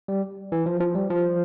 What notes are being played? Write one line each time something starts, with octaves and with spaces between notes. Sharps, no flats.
G3
E3
F3
F3
G3
F3